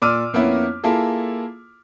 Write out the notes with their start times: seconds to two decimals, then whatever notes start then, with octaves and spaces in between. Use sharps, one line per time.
0.02 A#2 D5 D6 E6 F6 D#7
0.33 F2 A#3 B3 C#4 E4
0.84 A#3 E4 F4 G#4 A4